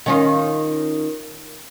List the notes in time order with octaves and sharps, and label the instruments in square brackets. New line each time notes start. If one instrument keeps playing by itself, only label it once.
[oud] D#3 C#4 F4